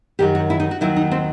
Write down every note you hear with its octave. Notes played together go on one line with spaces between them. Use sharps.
F#2 D#3 F#3 G4
F#4
E4
D#4
F#4
D#2 D#3 F#3 E4
D#4
C4